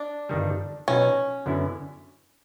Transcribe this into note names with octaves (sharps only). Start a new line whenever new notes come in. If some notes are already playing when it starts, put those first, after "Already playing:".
Already playing: D4
G1 G2 D#3 G3
B2 F#3 B3 C#4 D#4
F#2 D3 F#3 B3 E4